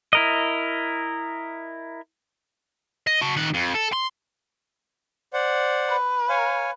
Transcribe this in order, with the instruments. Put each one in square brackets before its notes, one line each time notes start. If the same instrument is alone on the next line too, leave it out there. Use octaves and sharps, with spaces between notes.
[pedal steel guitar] E4 A#4 D#5
[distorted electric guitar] D#5
F#4 A5
D#3 F#5
F2
A4
C6
[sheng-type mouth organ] C5 D5 F#5
[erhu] B4
[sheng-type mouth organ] C#5 F5 G#5